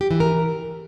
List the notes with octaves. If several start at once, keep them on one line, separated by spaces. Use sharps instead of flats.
G4
E3
A#4